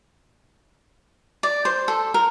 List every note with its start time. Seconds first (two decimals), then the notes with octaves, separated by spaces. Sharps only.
1.43 D5
1.65 C5
1.88 A4
2.14 A#4